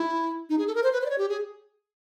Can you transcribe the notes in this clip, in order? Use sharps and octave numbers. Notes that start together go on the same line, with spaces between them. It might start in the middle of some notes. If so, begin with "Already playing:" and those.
Already playing: E4
D#4
G#4
A4
A#4
C5
B4
C5
D5
C#5
G4
G#4